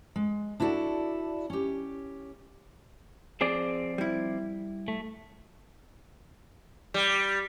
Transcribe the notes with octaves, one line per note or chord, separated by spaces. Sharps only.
G#3
D4 E4 F#4 G4 A4 D5
C#4 G4
F3 C4 G#4 D5
G3 E4
A3
G3